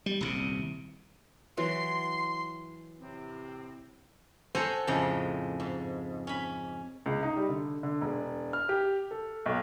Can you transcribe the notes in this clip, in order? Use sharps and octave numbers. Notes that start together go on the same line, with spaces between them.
G3
D#1 C2 C3
E3 F#3 F#4 C6
A2 C3 C4
A4 C5 C#5 F#5 G#5 A#5
F2 A2 C#3 G#3
G#2
C#4 B5
C#2
D#4
G3
D3
D3
E1
F6
G4
A4
B1